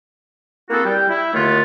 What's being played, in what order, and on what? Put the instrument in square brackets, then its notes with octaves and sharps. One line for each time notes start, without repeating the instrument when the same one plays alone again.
[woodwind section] A#3 C4 E4 F#4 G#4 A4
G3 G5
E4
D#2 D3 A3 B3 F4